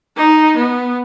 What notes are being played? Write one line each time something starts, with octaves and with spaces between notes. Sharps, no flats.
D#4
B3